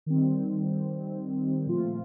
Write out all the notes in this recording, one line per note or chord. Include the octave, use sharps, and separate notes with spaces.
D#3 G3 C4
A#2 F3 A3 C4 F4